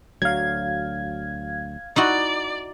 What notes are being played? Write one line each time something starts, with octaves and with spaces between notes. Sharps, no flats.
D2 F#3 F5 G#6
D#4 E4 F#4 D5